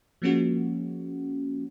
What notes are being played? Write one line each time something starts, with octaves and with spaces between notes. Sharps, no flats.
F3 G#3 A#3 C#4 F#4